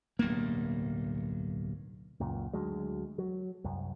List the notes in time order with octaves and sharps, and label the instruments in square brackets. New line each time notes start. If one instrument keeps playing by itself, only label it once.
[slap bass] D1 B1 G2 A#3
[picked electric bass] C#2 F#2 A#2
D2 F#3 G#3
F#3
C2 F#2